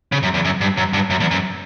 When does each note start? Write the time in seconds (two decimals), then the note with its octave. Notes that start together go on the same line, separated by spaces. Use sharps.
0.12 C#3
0.23 F#2
0.34 E2
0.45 F#2
0.61 G2
0.77 F#2
0.93 G2
1.10 F#2
1.20 E2
1.31 F#2